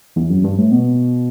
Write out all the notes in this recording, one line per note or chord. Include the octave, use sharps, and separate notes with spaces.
E2
F#2
G2
A2
B2